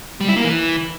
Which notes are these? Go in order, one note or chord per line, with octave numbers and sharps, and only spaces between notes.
G3
E4
A#3
E3